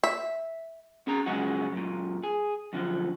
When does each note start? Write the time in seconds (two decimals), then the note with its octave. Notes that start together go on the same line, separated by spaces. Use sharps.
0.04 E5
1.07 C#4 G#4 A#5
1.26 G#2 C#3 F#3 G#3 C#4 F#4
1.72 F#2 A#2
2.24 G#4
2.73 F#2 D3 F3